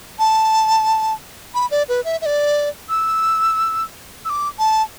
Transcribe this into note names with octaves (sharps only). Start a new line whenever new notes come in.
A5
B5
D5
B4
E5
E5
D5
E6
E6
D6
A5